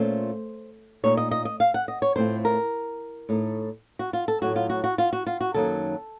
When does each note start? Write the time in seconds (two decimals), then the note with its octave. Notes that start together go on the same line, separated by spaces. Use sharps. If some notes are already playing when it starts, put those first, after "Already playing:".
Already playing: A#2 A3 C#4 F4 C5
1.03 A#2 A3 D#4 C#5
1.17 D#5
1.31 D#5
1.45 D#5
1.60 F5
1.74 F#5
1.88 D#5
2.02 C#5
2.16 A2 A3 C4 F4 C5
2.45 A#4
3.29 A2 A3 D#4
3.99 F#4
4.13 F4
4.28 A4
4.41 A2 F#3 A3 F#4
4.56 F4
4.70 F#4
4.84 F#4
4.98 F4
5.13 F#4
5.27 F4
5.41 F#4
5.54 F#2 D#3 F#3 A#3 D#4 A4